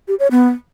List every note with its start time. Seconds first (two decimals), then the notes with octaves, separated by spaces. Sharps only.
0.08 G4
0.20 C#5
0.31 B3